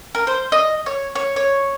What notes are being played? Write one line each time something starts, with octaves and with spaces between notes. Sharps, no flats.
A#4
C5
D#5
C#5
C#5
C#5